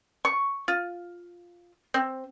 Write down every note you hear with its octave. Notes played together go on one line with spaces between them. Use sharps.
C#6
F4
C4